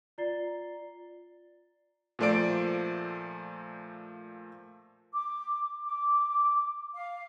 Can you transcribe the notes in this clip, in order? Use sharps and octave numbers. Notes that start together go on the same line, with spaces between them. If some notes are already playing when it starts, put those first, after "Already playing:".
F4 D5 A#5 A6 C7 G7
A#2 F3 A3 C5 D5 D7
D6
D6
F5